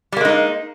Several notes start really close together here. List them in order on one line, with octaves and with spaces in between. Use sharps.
G3 A#3 G#3 D#4